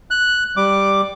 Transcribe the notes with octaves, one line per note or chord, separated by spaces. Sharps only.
F#6
G3 D6